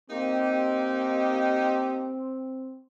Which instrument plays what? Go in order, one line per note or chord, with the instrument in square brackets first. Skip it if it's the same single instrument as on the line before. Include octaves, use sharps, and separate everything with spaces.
[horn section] A#3 D#4 G4 [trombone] C4